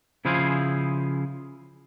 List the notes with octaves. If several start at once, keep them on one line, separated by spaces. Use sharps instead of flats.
C#3 F3 E4 G#4 C5 F5